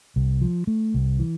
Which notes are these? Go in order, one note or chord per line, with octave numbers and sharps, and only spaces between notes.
C2
F3
A3
C2
E3